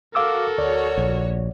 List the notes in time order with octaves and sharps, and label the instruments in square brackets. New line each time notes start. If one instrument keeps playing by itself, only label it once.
[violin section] F#4 [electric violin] A4 A#4 [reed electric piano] F5 D6 E6
[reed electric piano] D2 D5 [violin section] F#4 C#5
[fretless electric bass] A#1